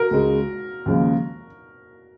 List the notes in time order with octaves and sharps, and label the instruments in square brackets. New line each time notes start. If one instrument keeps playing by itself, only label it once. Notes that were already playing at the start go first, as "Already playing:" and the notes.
Already playing: [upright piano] F#4 A#4
[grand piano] C#2 C#3 G#3
D#2 C#3 F3 G#3